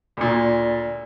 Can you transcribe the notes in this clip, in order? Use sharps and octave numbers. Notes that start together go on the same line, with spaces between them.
D2 A#2